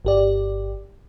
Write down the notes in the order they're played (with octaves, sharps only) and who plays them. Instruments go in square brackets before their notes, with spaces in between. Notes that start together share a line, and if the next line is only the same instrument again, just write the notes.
[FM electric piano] G1 G4 D5